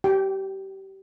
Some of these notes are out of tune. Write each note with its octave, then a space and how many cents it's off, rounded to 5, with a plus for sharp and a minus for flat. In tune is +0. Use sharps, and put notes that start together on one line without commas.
G4 -25 G5 +0